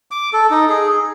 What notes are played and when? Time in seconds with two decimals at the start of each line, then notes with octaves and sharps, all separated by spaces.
0.11 D6
0.33 A4
0.51 D#4
0.69 G#4